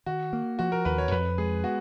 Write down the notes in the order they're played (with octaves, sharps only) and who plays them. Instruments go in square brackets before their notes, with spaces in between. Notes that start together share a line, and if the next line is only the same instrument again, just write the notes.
[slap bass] D#3 [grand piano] F#4
[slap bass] A#3
[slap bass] F3 [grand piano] F#4
[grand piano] A#4
[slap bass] D#2 [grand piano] B4
[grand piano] C#5
[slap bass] F2 [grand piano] B4
[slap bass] G#3 [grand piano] G#4
[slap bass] B3 [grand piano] F#4